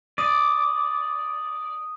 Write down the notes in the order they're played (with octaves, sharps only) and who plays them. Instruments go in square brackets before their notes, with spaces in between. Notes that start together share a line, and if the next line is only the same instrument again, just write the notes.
[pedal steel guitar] D5 [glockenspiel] D#6 D#7